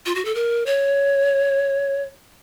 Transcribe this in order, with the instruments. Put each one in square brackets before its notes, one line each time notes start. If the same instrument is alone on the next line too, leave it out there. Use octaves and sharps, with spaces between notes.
[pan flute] F4
F#4
A4
A#4
C#5